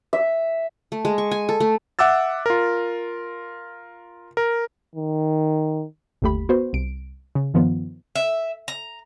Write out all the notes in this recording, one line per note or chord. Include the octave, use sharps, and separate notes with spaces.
E5
A3
G#3
C#6
G#5
A4
A3
E5 F#5 D6 E6 A6
F4 A#4
A#4
D#3
G1 D#2 A3 G4 B5
B3 F#4 C5
C2 D7
C#3
G2 D#3 F3 B3
E5
A#5